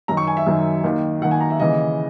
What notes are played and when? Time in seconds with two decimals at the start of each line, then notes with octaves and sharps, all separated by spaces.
0.08 F#2 D#3 A#5
0.17 C#6
0.27 G#5
0.37 E5
0.47 F#2 D#3
0.84 D#2 D#3
1.22 D#2 F#5
1.25 D#3
1.31 G#5
1.40 A#5
1.50 E5
1.59 D#2 C#3 E3 D#5